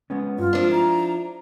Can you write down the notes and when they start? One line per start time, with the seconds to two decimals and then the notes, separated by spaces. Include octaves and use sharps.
0.10 G#3 B3 C#4
0.38 G2 F4
0.53 F3 G#3 C4 D4
0.72 E4 A#5